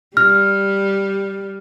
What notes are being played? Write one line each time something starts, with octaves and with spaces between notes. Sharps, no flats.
G3 F6